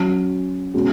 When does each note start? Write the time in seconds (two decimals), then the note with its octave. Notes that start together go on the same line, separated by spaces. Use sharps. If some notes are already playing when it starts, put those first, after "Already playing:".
Already playing: F#3 C#4 F#4
0.74 B2 G#3 C#4 F#4